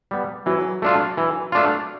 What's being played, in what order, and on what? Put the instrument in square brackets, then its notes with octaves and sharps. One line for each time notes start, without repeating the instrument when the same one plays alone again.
[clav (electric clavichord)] G3 B3
[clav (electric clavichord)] E3 [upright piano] F#3
[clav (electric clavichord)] A3 D4 F4
E3
A3 D4 F4